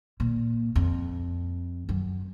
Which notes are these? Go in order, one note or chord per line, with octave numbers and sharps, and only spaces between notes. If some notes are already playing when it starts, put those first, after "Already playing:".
A#2
F2
F#2